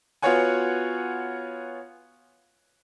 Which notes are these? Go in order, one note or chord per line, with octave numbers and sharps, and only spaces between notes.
B3 F4 F#4 C#5 F#5 G#5